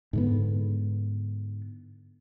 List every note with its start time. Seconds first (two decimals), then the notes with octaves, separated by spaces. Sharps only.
0.13 G#2 D3 B3